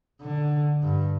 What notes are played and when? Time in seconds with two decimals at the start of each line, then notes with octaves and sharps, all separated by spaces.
0.22 D3
0.84 G2